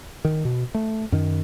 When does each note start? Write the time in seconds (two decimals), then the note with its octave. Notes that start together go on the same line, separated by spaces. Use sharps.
0.25 D#3
0.45 B2
0.75 A3
1.12 F#2 D#3